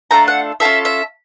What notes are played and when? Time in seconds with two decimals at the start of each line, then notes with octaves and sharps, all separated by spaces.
0.11 A3 D4 F4 A4 A#5
0.28 F#5
0.60 C#4 F4 A4 E5
0.85 E5